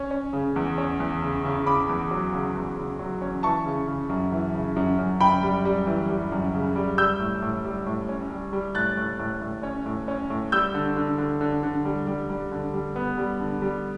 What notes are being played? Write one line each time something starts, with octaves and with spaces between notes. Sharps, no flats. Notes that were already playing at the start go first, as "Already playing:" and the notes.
Already playing: C#4
C#4
C#3
E2
C#4
E2
C#3
C#3
C#3 B5 D6
E2
F#3
C#3
E2
C#3
F#3
C#4
E3 A5 C#6
C#3
C#3
F#2
E3
C#3
F#2
F#2
F#2 G5 B5
G3
G3
E3
G3
F#2
C#3
G3
G3 E6 G6
A2
A2
G3
A2
C#4
G3
G3
A2 F#6 A6
A2
A2
A2
C#4
A2
C#4
A2
G3 E6 G6
D3
D3
D3
D3
D3
G3
G3
G3
D3
G3
B3
G3
D3
G3